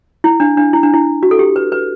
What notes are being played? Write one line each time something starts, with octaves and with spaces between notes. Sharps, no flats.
E4
D4
D4
E4
D4
E4
F#4
A4
G4
B4
B4